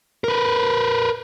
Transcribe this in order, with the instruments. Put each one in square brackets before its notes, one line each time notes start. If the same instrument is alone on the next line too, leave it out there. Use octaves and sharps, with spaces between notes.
[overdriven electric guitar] A#4 B4